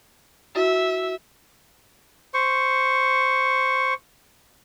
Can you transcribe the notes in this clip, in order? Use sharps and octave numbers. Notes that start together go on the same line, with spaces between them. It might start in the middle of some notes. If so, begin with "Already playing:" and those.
E4 F#4 E5 E6
C5 C#6